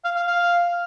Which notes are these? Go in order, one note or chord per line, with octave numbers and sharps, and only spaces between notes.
F5
F5
F5